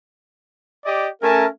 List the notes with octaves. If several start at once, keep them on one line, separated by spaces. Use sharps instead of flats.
G4 D5 D#5
A3 C#4 A#4 E5 G#5 A5